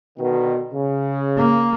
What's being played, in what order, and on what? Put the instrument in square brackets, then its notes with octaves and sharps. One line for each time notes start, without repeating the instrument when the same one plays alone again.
[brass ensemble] B2 D3 D#3
C#3
[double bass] A#3